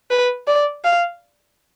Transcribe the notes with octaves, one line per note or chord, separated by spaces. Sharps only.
B4
D5
F5